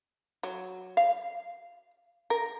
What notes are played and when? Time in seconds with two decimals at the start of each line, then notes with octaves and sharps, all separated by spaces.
0.43 F#3
0.97 F5
2.30 A#4